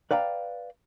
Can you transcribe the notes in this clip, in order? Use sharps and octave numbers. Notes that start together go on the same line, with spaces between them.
B4 D5 F5 G5 A#5